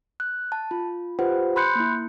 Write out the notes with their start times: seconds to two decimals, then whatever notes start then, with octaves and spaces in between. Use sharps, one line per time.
0.20 F#6
0.52 A5
0.71 F4
1.19 F4 G4 B4 C5 F#5
1.56 B5 C6 F#6 G6 C#7
1.75 A#3 E4